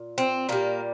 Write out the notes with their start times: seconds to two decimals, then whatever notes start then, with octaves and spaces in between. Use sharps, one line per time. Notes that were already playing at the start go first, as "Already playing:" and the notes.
Already playing: A#2
0.18 C4
0.49 A#2 G3 A#3